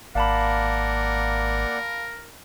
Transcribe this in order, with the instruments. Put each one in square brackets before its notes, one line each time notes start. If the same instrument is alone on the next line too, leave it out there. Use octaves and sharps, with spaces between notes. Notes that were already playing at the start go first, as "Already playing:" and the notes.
[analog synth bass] G#1 [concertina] A#3 D5 F#5 [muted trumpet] A#4 [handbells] F5 A5 B5